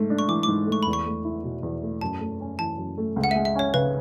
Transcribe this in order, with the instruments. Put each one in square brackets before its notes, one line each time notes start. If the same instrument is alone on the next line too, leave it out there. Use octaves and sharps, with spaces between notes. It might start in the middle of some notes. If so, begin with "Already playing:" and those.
Already playing: [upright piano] G#2 A3
D4
[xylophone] C#6
[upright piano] E3 [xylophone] D6
[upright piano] G#2 [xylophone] D6
[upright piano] A3
[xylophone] C#6
[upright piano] E2 [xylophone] B5
[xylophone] C#6
[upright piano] A3
E4
B2
E2
A3
[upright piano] F#2 [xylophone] A5
[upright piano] A3
C#4
[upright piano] E3 [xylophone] A5
[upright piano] F#2
A3
C#2
[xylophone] F#5
[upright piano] G#3 [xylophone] E5
[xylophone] E5
[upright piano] C#4 [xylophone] C#5
[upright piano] C#3 [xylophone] B4